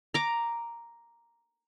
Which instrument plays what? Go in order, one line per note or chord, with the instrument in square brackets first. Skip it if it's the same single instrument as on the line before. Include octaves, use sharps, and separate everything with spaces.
[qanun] A#5 D6